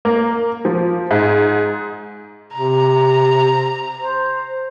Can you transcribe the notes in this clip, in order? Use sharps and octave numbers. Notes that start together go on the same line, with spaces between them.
A#3
F3
G#2
C3 A#5
C5